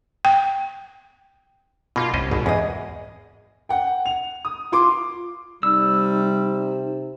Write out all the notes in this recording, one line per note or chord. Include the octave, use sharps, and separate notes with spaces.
G5
B2 A#3 D#4 F4
C2 C#4 C5 D#5
G#1 G#2 B2
E2 G#4 D#5
F#5 G5
F7
D#6
F4 C6 D6
C3 G3 D#4 E6